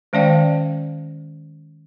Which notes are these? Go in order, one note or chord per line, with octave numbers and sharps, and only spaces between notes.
D#3 G#3 C#4 D5 F5 G5